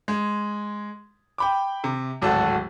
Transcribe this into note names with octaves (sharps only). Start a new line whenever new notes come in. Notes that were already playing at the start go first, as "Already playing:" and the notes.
G#3
G5 B5 D6
C3
D1 G#1 F#4 A4 A5